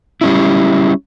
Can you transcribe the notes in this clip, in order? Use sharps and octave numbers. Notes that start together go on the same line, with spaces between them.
G3 C#4 E4